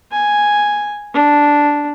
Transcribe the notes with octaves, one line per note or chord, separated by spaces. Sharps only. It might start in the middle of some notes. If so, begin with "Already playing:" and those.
G#5
D4